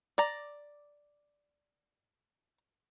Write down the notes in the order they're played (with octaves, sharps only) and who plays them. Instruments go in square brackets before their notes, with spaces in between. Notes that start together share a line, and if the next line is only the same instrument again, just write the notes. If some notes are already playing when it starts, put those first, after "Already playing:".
[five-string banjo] D5 A#5